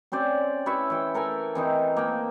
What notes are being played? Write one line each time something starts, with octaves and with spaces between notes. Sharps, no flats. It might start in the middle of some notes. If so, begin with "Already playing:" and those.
C4 C#4 C5 D5
E4 B4 C#5 E5
E3 G5
A4 A#4 G5 G#5
E3 C4 D#4
A#3 G5